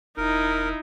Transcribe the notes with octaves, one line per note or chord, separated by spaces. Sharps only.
E1 D#4 E4 A#4